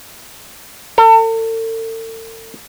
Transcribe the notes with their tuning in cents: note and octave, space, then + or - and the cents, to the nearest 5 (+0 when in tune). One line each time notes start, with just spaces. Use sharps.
A4 +40